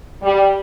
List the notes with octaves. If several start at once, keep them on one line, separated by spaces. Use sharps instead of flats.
G3